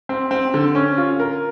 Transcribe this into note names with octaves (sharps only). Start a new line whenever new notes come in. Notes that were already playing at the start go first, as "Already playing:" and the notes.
C4
C4
D3
C#4
F4
A#4